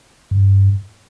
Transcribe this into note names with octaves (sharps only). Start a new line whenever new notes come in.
G2